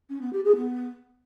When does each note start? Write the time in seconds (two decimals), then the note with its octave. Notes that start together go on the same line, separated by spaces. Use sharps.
0.09 C#4
0.21 B3
0.32 G4
0.44 G#4
0.56 B3